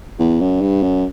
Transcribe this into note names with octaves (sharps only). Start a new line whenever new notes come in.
E2
F#2
G2
F#2